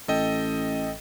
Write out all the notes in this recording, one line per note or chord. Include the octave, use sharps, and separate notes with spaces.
A1 A4 D#5 G5